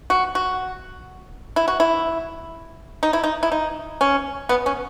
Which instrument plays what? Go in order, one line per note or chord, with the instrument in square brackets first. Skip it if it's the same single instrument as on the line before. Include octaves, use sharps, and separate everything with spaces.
[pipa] F#4
F#4
E4
F#4
E4
D#4
E4
D#4
E4
D#4
C#4
B3
C#4